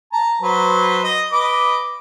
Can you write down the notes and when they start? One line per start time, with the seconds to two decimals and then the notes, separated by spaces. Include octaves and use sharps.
0.12 A5 A#5
0.41 F#3 B4 C5
1.04 D#5
1.32 B4 D#5 D6